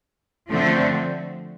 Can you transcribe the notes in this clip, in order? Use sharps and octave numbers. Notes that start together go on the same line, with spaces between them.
D3 F3 A3 C4